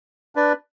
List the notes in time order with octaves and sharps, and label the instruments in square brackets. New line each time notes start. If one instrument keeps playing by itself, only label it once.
[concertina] D4 B4 D5